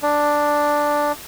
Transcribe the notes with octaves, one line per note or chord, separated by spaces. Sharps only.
D4